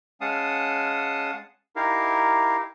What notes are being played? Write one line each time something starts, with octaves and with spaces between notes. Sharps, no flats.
G#3 C#4 F5 F#5 A5 D#6
D#4 E4 G4 A#4 F5